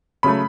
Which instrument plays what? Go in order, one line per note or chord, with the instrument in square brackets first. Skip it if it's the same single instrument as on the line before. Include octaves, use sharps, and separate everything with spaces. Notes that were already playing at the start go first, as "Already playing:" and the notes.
[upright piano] C#3 F#3 A3 B5